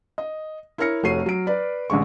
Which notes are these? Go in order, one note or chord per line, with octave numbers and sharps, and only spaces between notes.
D#5
E4 A#4 C#5 F6 A#6 C#7
F1 A3 F#4 C#5 C7 D#7
F#3 D7
B4 D5
A1 D3 G#3 C#6